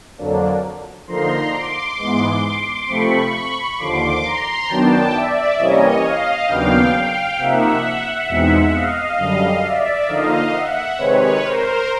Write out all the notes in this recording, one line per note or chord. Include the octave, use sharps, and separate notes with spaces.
F2 D3 F#3 A#3 D4
D3 F3 A#3 D#4 A#5 C6
C6 D6
G#2 E3 G#3 B3
C3 F3 A3 C4 B5 C#6
D#2 D3 F3 C6 D6
A#5 C6
F#2 D#3 F#3 B3 D4 G5 A5
D5 E5
C3 E3 G3 A#3 C#4 C#5 D#5
D#5 F5
D#2 C#3 F#3 B3 D4 F5 G5
F5 G5
C3 F3 A#3 D#4 E5 F#5
E2 B2 G#3 C4 D#4
D#5 F5
F#2 D3 G3
D5 E5
D3 F3 A#3 D#4 D#5 F5
E5 F#5
C3 D#3 G#3 C4 B4 C#5
A#4 C5